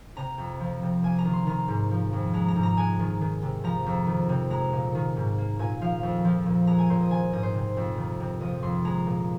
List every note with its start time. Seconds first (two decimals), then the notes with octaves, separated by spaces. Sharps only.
0.17 C3 A#5
0.38 F2
0.60 F3
0.82 C3
1.03 A#3 G#5
1.19 A#5
1.25 D#3
1.33 C6
1.47 D#3 A#5
1.68 G#2
1.91 F3
2.13 F2
2.34 G#3 A#5
2.48 A#5
2.56 G#2
2.63 A#5
2.77 G#3 G#5
2.99 D#3
3.21 D#3
3.42 C3
3.64 F3 A#5
3.86 F2
4.07 D#3
4.29 C3
4.50 G#3 A#5
4.73 A#2
4.95 D#3
5.17 G#2
5.38 A#3
5.59 A#2 G#5
5.81 F3 F5
6.03 F2
6.25 F3
6.46 A#2
6.67 G#3 A#5
6.79 G#5
6.90 A#2 C5
7.01 D#5
7.10 D#3 G#5
7.33 G#2 D#5
7.43 C5
7.54 C3
7.77 F2
7.98 D#3
8.20 C3
8.41 F3 D#5
8.62 F2 C6
8.85 G#3 A#5
9.07 A#2